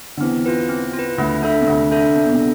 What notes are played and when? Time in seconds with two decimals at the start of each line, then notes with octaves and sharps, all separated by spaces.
0.17 D3
0.21 E2 E3 C4
0.46 F4 B4
0.69 C4
0.93 F4
0.99 B4
1.18 D2 D3 A3
1.43 D4 A4 E5
1.61 C3
1.66 D2 D3 A3
1.91 D4 A4 E5
2.15 C3 D4
2.24 B2
2.33 C3
2.39 A4